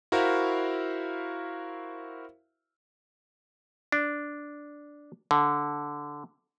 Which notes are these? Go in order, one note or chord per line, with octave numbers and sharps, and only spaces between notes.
E4 F#4 A#4 C5 E5 F5
D4
D3